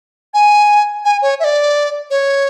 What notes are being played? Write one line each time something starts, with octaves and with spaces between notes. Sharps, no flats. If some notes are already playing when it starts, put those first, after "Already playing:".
G#5
G#5
C#5
E5
D5
C#5